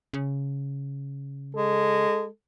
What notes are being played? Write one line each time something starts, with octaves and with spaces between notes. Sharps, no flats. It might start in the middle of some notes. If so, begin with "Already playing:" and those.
C#3
G#3 A4